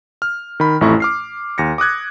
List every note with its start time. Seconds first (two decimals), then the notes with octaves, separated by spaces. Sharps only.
0.22 F6
0.60 D#3 B5
0.81 A1 F2 A3 E4 A#5 C#6
1.00 D6 F6 C7
1.58 D#2 A#6 C#7
1.78 D6 D#6 F#6 G#6